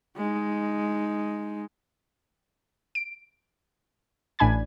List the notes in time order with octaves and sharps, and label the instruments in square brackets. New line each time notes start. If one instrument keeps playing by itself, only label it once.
[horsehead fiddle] G#3 D#4
[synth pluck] D7
A1 A2 D4 G#5 B5 G#6